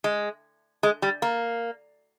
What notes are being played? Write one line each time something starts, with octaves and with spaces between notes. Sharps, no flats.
G#3
G#3
G3
A#3